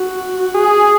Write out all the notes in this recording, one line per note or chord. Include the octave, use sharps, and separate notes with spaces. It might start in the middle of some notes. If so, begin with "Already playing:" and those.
Already playing: F#4
G#4